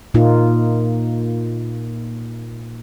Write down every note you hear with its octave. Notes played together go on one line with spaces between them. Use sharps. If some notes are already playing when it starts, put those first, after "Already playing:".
A#2 A#3 D#4 F4